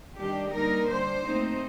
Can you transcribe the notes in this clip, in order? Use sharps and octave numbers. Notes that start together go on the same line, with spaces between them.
D#3 G3 D4 G4
D3 G3 A#3 D#4 A#4
D3 G3 D4 C5
A#2 A3 C4 D#4